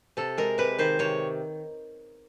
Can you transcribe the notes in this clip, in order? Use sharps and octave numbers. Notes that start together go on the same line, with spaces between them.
C3 A4
G#3 A#4
C3 B4
D#3 C5
C3 C#5